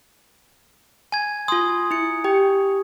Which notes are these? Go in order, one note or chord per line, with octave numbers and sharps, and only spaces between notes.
G#5 G#6
F4 C6 D#6
E4 C#7
G4 G5